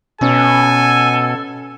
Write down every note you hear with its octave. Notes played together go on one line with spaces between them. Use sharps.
B2 C#4 A4 G#5